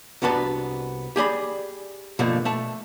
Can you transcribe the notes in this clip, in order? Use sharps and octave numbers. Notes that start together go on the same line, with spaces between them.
C2 B3 D4 F#4 B4 A5
G4 G#4 D5 B5
B2 D3 F3 A3 A#3
A3 A5